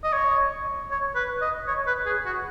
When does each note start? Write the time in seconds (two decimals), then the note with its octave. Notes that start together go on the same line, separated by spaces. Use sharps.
0.04 D#5
0.13 C#5
0.91 C#5
1.15 B4
1.41 D#5
1.67 C#5
1.87 B4
2.06 G#4
2.25 F#4